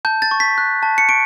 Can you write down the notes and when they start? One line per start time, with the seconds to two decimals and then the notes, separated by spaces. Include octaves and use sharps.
0.05 A5 G6
0.22 A6
0.31 C#6
0.40 B6
0.58 F#6
0.83 A5
0.98 C#7
1.09 C#6 D7